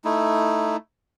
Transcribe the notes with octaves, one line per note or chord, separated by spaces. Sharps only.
A3 D#4 E4